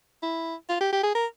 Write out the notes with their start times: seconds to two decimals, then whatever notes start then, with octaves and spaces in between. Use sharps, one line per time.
0.22 E4
0.69 F4
0.81 G4
0.93 G4
1.03 G#4
1.15 A#4